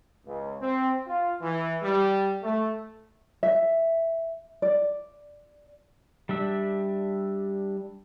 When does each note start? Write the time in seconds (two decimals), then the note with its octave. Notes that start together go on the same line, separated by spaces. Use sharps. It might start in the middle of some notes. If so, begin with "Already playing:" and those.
0.26 C#2
0.60 C4
1.07 F4
1.41 E3
1.81 G3
2.42 A3
3.43 E5
4.62 D5
6.29 G3 D4 E5